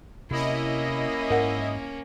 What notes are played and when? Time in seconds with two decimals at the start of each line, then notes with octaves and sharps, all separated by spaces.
0.31 C3 A#3 C#4 E4 D#5
1.30 G#2 A#4 F#5